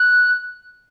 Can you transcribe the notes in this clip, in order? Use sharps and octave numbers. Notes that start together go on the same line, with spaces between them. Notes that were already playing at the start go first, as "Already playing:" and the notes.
Already playing: F#6